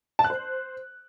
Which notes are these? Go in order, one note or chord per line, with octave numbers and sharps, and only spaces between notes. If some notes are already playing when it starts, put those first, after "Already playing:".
A5
F#6
C5